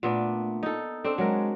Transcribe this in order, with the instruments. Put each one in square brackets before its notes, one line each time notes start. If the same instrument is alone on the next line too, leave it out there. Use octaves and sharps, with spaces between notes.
[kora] A#2 B3 D4 [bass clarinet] A3
[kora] D#4 A4
[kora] C4 D4 [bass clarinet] A4
[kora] F#3 A#4 [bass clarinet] G#3